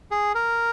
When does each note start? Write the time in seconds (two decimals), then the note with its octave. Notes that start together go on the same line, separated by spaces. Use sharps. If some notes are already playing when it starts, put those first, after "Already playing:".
0.11 G#4
0.35 A#4